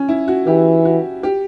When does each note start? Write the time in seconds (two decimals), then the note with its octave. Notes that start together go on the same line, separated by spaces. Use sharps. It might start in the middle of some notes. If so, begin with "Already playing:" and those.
Already playing: C#4
0.09 E4
0.28 F#4
0.46 E3 G4
0.85 F#4
1.23 G4